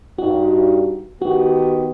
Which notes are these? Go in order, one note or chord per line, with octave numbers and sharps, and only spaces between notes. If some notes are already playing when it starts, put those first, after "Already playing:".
G2 D#4 F#4
D#3 B3 F#4 G4